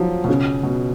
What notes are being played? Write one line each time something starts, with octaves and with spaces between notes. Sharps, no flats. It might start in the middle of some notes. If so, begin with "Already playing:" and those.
Already playing: F3 F#3
B2
C#3
B2